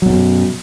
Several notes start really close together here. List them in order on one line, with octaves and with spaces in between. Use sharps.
F#3 B2 F#2